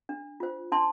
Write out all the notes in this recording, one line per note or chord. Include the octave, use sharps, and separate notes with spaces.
D4
F4 C5
D4 A5 C6